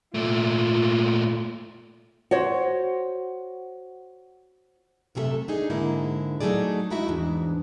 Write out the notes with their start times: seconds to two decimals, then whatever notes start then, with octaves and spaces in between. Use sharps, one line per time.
0.14 A#2 A3 F4
2.31 F#4 C5 C#5
5.15 F#2 C3 A3 G#4 A4 E5
5.48 D4 D#4 G#4
5.70 G#2 D3 A#3 E4
6.41 F#3 A3 D#4 G#4 D5
6.90 G#3 D#4 E4 F#4 E5
7.08 E2 G#2 D4